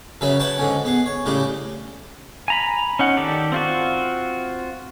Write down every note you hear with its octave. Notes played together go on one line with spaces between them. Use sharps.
F#2 C#3 C#4 B4 E5
B4 C#5 F#5 G5 A5
G#2 D3 C#4
B3 G#4
C#5
A2 C#3 G3 G4
G#5 A#5 B5
C#4 D#4 F#5
D#3 G4 A4 D5
C4 F4 F#4